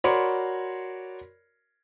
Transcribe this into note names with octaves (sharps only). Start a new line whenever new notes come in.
F#4 A#4 C#5 D5 B5 C6